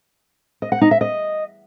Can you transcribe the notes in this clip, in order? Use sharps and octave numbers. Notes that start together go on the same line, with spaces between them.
D#5
F#5
D#4
E5
D#5